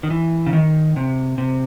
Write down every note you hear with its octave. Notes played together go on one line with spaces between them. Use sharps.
D#3
E3
C#3
D#3
C3
C3